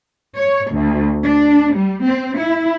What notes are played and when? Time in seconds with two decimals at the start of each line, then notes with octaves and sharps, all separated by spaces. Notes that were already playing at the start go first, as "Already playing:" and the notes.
0.36 C#5
0.71 D2
1.24 D4
1.75 G3
2.04 C4
2.38 E4